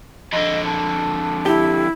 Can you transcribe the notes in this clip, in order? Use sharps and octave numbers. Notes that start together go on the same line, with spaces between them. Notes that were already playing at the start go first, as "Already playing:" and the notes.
F2 D3 D#5
A5
E4 G4